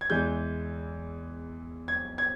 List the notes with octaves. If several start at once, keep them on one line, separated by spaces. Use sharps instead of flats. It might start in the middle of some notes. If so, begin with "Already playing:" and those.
G#6
E2 E3 G#3 G6
G#6
G#6